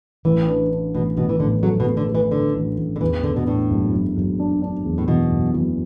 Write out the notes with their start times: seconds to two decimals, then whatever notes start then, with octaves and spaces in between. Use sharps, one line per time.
0.25 A1 E3
0.47 D4
0.71 D4
0.94 A1 B2
1.17 A1 B2
1.29 E3
1.40 A2 D3
1.63 F#3 A3
1.80 B2
1.86 A3
1.97 D3
2.09 A3
2.15 E3
2.31 D3 D4
2.55 A1
2.78 A1
2.96 D3
3.01 E2 E3
3.24 D3 D4
3.36 B2
3.47 A2 D4
3.70 F#1
3.93 F#1
4.17 F#1
4.40 D4
4.62 D4
4.85 E2
4.98 A2
5.08 B2 E3
5.31 F#1
5.54 E3